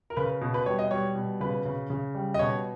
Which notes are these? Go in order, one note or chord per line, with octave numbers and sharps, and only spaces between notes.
A#4
C#3 B4
B2
B4
G3 C#5
D#5
G3 C#5
B2
C#3 B4
C#3
C#3
G3
D#5
B2 C#5